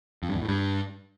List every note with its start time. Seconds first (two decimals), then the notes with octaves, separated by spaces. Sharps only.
0.23 F2
0.29 G2
0.36 E2
0.42 A2
0.48 G2